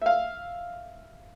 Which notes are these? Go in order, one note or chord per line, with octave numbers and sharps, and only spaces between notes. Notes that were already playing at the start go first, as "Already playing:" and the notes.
E5 F5